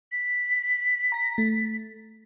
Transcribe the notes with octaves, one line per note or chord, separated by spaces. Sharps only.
B6
A#5 A#6
A3